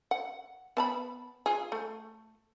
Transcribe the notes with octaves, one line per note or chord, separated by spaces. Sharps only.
F#5
B3 A5 B5
F4 G#4
A3